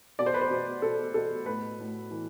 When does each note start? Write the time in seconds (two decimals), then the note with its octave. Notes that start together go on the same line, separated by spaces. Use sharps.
0.19 B2 D5
0.26 C5
0.34 B4
0.41 C5
0.50 B2
0.82 B2 A4
1.14 B2 A4
1.46 A2 B4
1.79 A2
2.11 E3